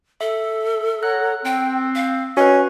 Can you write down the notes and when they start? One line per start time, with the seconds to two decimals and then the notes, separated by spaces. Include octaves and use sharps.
0.21 A4 E5
1.03 C#5 F#5 A#5 F#6
1.45 C4 G5
1.95 F5
2.37 C#4 F#4 B4 D#5